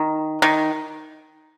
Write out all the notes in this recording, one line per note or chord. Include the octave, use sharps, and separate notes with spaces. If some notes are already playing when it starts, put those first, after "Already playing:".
Already playing: D#3
D#3